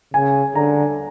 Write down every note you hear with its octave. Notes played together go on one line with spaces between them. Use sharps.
C#3 G#5
D3 A#5